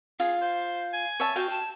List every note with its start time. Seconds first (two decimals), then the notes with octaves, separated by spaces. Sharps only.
0.20 F4 G#4 F5
0.41 C5
0.93 G#5
1.20 C#5 E5 A5
1.36 F#4 F5 G5
1.50 A5